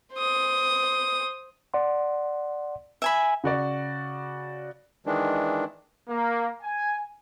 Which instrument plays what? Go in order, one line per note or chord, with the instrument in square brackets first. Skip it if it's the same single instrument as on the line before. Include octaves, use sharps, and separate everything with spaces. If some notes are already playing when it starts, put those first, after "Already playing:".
[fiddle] C5 D#6
[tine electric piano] D5 F#5 C6
[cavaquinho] E5 G#5 B5
[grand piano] C#3 F#4 D5
[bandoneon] D#3 E3 G#3 D4
[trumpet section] A#3
G#5